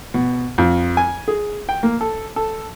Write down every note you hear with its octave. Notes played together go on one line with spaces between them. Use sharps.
B2
F2
G#5
G#4
G5
A#3
A4
A4